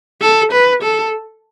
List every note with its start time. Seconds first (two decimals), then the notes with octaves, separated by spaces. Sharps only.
0.21 A4
0.52 B4
0.82 A4